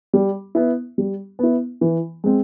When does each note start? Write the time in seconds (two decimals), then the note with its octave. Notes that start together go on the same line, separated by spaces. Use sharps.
0.13 G3
0.55 B3 E4
0.98 G3
1.39 B3 E4
1.81 E3
2.24 G#3 C4